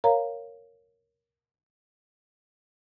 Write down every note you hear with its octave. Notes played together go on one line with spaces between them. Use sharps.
A#4 C#5 F5 A#5